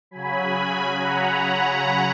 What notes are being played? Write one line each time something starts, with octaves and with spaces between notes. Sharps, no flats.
C#3 F#3 G#5 B5
F#5 A#5
F#5 A#5